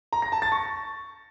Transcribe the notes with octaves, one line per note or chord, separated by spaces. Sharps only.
A#5
A#6
A5
A6
C#6